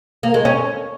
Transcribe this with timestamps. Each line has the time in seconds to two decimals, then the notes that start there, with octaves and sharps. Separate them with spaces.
0.23 A#3
0.34 G#3
0.45 C#4